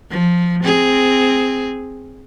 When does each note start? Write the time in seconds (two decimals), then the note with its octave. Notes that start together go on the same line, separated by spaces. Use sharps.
0.11 F3
0.64 C4 G#4